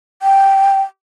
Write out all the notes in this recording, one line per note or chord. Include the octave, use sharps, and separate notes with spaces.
G5